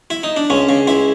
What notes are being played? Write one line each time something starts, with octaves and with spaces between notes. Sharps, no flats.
E4
D#4
D4
C#2 C#4
C#3
C#2 E4